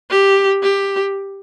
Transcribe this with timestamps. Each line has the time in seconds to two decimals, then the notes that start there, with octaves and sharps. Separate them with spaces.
0.11 G4
0.63 G4